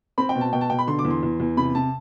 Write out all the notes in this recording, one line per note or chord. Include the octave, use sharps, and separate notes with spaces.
C4 B5
G5
B2
A5
B2 G5
A5
B2 G5
B5
D3 C6
D6
E2
C6
E2
E2
C3 B5
C3 A5